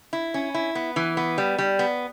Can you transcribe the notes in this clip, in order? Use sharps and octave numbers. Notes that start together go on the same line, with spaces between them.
E4
C#4
E4
B3
E3
B3
G3
G3
B3